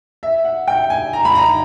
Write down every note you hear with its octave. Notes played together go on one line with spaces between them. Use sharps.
E5
F#5
G5
G#5
A#5
B5
A#5